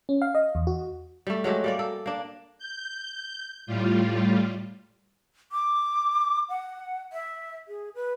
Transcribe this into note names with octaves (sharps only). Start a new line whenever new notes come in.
C#4
F5
D#5
E2
F#4
G3 A3
F#3 G#3 A3 G4
G3 A#3 D5
A4
A#3 D4
G6
A2 G3 F4
D6
F#5
E5
G#4
B4